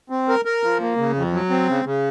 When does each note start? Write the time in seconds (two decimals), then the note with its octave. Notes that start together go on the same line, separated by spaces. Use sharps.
0.10 C4
0.29 A#4
0.45 A#4
0.63 F3
0.81 A#3
0.97 C#3
1.15 F2
1.33 F#3
1.50 C4
1.68 C#3
1.85 C#3